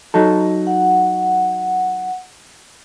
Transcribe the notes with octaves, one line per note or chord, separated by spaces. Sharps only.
F#3 D#4 A4
F#5